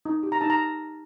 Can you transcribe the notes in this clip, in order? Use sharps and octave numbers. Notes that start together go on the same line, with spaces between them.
D#4
G4
A#5
D#4 A5
A#5